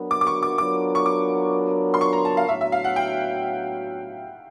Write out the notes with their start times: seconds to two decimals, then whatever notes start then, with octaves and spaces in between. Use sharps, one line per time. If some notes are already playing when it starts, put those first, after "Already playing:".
Already playing: F#3 B3 D4 F#4 A#4
0.11 D6
0.21 D6
0.27 C#6
0.43 D6
0.58 F#3 B3 D4 F4 A#4 D6
0.95 C#6
1.06 D6
1.94 C6
2.01 C#6
2.13 A#5
2.25 A5
2.37 F5
2.48 A2 F#3 B3 D4 F#4 E5
2.61 E5
2.72 F5
2.84 F#5
2.96 G5